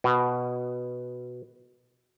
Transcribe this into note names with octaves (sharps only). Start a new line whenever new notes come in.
B2